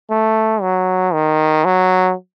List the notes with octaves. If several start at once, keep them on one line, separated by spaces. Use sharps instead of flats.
A3
F#3
D#3
F#3